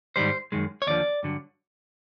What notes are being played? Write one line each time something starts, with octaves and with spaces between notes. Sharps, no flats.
G#2 D#3 G3 C5
F#2 D#3 G#3
C#5
D#2 D3 F3 D5
G2 D3 F#3